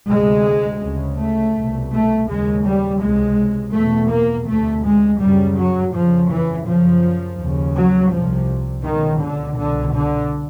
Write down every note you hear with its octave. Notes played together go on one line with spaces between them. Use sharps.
D2 C3 G#3
D2 C#3
A3
C2 B2
A3
D#2 C#3 G#3
G3
C#2 C3 G#3
E2 B2 A3
A#3
D2 C3 A3
G#3
F#2 C#3 G3
F#3
F2 C#3 F3
E3
F#2 C#3 F3
D#2 C#3
F#3
C2 C3 F3
C#2 B2 D#3
D3
C2 B2 D3
D3